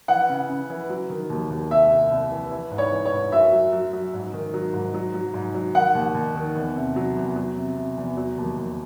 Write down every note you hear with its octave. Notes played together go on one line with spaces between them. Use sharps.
E3 F#5
C#3
C#3
E3
F#3
D#3
D#2
D#2
C2 E5
C2
C2
E3
E3
G#2
C#5
E3
C#5
G#2
F#2 E5
F#3
F#3
F#3
G#2
D#3
F#3
G#2
F#3
F#3
G#2
F#3
D#3 F#5
D#2
D#2
D#3
E2
C3
F#3
E2
F#3
C3
C3
E2
F#3
D#2
D#2